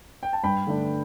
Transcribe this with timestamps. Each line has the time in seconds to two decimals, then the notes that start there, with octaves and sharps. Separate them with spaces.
0.23 G5
0.33 A5
0.44 G2 G5 B5
0.67 D3 A3 D4